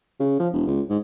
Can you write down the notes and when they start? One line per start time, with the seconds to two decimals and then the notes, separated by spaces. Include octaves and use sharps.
0.20 C#3
0.39 F3
0.53 E1
0.67 C#2
0.89 G#2